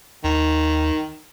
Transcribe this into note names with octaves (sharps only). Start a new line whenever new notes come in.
D#2 D#3